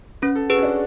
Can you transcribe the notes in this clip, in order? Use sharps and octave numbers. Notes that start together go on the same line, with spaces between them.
C#4 B4
A4
F#4 G#4 B4
C#4
D4